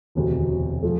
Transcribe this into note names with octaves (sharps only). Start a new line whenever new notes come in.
E1 D2 C3
F3 A3